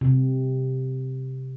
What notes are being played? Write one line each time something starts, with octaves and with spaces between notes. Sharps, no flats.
C3